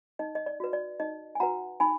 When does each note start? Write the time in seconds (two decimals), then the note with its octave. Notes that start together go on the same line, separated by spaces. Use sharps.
0.19 D#4 D#5
0.35 D#5
0.46 D5
0.60 F#4 B4
0.73 D5
1.00 D#4 D#5
1.35 G#5
1.40 F#4 B4 F#5 A#5
1.80 D#4 G#5 B5